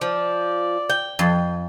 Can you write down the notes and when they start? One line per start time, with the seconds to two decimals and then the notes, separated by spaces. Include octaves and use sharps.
0.01 F3 D5
0.90 G5
1.19 F2 C6